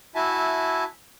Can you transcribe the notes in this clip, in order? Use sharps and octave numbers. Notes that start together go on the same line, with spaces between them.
E4 F#4 E5 G#5 A5